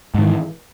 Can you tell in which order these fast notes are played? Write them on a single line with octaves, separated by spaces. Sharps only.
G#2 D#3 E3